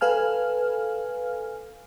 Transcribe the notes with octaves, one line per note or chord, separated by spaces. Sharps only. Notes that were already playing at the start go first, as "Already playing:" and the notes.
A4 B4 F5 G#5 F6